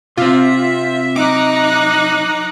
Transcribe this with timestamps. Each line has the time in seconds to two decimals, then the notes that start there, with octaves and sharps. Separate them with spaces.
0.18 C3 C4 F4 E5
1.16 F#3 D#4 A#5 D6 F#6